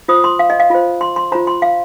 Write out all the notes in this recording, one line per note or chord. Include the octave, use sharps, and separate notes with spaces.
F4 C5 D#6
C6
F5
D#5
F5
F4 C5
C6
C6
F4 C5 A#5
C6
F5